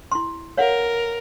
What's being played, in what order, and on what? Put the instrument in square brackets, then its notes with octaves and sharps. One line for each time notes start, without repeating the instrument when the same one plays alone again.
[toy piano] E4 C6
[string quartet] A#4 [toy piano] C#5 F5 F#5